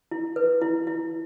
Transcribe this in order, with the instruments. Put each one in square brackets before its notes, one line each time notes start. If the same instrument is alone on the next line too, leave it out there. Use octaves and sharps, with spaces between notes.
[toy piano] E4
B4
E4
E4